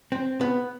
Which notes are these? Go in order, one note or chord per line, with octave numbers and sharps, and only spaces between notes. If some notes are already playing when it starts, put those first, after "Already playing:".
C4
B3